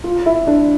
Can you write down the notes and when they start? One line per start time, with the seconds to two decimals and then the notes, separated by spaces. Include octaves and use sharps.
0.04 F4
0.26 E4
0.47 D4